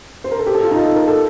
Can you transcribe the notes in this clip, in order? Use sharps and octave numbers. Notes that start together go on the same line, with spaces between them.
C5
A#4
A4
G4
A4
F4
D#4
A4
A#4
A4